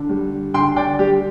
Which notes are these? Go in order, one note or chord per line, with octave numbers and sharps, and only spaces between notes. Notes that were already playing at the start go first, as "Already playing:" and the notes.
Already playing: D3
G3
D3 G5 C6
D5 G5
G3 G4